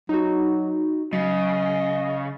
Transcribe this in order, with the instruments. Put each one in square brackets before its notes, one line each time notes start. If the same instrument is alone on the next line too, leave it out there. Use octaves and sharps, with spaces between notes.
[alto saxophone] F#3 [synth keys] D#4 F#4
[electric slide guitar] C#3 [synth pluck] F#3 [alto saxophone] D#5 [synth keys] A6